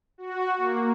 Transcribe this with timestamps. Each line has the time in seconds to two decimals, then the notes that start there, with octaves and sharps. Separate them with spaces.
0.18 F#4
0.57 A#3